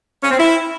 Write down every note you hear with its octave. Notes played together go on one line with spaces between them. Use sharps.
C#4
C4
E4